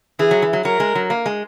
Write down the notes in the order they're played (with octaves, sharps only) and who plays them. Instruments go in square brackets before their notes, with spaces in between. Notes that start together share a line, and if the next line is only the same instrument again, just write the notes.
[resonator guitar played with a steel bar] E3 [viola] G#4
[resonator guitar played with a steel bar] F#3
E3
F#3
[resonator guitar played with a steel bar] F#3 [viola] A#4
[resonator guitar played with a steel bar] G#3
F#3
A#3
G#3